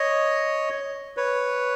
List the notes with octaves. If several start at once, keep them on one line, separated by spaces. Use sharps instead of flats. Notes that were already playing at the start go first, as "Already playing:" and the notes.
Already playing: C#5 D#5
B4 C#5